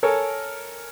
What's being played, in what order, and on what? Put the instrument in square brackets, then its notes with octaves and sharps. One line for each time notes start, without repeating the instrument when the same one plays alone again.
[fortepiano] A4 A#4 C#5 G#5